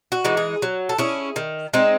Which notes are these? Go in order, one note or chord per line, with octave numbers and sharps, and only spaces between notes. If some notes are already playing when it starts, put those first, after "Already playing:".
F#4
E3 G#3 D#4
G#4
F#3
A4
C#4 E4 G#4
D#3
G#3 C4 D#4